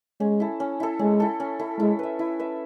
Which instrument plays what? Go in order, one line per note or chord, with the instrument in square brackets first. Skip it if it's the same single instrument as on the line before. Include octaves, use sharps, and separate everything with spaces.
[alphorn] G#3 [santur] C#4
[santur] E4 A4
C#4
E4 A4
[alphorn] G#3 [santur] C#4
[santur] E4 A4
C#4
E4 A4
[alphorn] G#3 [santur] E4
[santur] B4 E5
E4
B4 E5